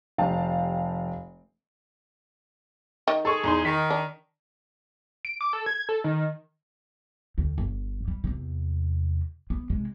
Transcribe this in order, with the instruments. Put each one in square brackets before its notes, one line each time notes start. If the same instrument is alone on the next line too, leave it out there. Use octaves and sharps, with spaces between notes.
[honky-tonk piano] F1 G3 G4 F5 G5 A5
[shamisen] D#3
[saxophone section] G#4 [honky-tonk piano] A4 C#6
[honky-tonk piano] E2 D#4 C6
[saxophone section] D#3 [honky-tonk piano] B6
[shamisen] D4
[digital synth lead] D7
D6
A4
G#6
A4
D#3
[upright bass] D2
G1
G3
E2 C3
B3
C3 G#3